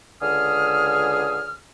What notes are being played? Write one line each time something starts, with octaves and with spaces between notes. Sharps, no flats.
C#2 D3 G#4 D#6 F6